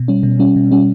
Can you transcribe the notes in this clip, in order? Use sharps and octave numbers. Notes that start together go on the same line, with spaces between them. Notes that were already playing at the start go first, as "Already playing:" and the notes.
Already playing: B2
G3 C#4
B2
G3 C#4
B2
G3 C#4